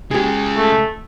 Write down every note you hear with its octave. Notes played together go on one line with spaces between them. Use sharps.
C#3 G#3 G4 G#4
A3